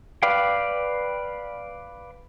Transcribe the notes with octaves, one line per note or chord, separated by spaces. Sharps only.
B4 D5 F5 G5